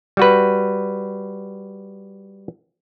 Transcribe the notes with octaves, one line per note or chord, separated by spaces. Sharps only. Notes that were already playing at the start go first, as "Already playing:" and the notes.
G3 F#4 B4